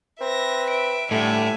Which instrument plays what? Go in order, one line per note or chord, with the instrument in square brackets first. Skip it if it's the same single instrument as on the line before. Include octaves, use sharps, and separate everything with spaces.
[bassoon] C4 [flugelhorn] B4 [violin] E5 A#6
[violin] E5 D7
[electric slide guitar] A2 [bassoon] D3 [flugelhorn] G3 [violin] E5 G#5